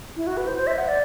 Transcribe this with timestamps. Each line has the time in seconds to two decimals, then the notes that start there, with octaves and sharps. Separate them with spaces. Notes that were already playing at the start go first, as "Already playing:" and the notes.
0.17 E4
0.27 F#4
0.37 B4
0.47 C5
0.57 C5
0.67 E5
0.78 F#5
0.88 D5